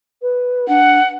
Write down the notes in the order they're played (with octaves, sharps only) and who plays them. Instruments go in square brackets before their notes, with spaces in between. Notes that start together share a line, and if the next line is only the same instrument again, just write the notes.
[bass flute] B4
[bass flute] D4 [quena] F#5